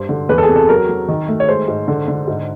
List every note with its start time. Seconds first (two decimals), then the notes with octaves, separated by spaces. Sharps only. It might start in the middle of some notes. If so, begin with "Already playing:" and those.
Already playing: G2 C5
0.09 D3
0.29 E2 B4
0.38 A4
0.42 G#4
0.49 C3
0.56 A4
0.69 F#3 A#4
0.89 F#3
1.08 D#3
1.28 A3
1.40 C#5
1.48 G#3 C5
1.68 G#2
1.88 D3
2.08 D3
2.27 G#2